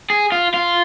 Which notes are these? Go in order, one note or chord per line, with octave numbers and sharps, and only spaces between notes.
G#4
F4
F4